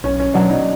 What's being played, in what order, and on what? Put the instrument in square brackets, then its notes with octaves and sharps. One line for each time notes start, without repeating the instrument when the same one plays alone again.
[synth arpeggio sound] B1 [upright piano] C#4
[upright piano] C#4
[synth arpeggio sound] B2 F#3 [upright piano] D4
[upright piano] D#4